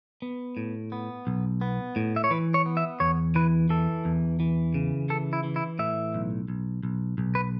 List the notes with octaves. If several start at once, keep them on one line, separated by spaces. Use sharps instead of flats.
B3
A2
B3
B1
B3
A2
E5
C#5
E3 B4
C#5
B3
E5
E2 C#5
E3 B4
E3 A4
E2
E3
C#3
E3 A4
E4
E3
E4
A2 E5
B1
B1
B1
B1
B4